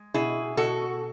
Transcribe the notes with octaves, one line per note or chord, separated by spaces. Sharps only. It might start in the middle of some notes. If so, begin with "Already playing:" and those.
Already playing: G#3
B2 E4 G#4
B2 F#4 A4